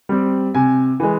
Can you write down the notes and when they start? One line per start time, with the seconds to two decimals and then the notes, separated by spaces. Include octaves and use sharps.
0.09 G3 C4
0.55 C3 G#5
1.00 E3 G#3